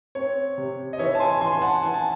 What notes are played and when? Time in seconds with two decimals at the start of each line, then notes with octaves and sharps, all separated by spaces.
0.15 C4 C#5
0.58 C3
0.93 D#5
0.99 E3 C#5 E5
1.15 A5
1.20 G#5 C6
1.41 E3 G#5 C6
1.52 C6
1.62 F#5 A5
1.83 E3 G#5
1.94 A5